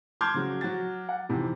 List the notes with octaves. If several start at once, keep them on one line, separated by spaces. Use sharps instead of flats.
A5 C6 D6 F6 G6 G#6
C#3 F#3
F#3 F#4 A6
F#5
F2 C3 D#3 E3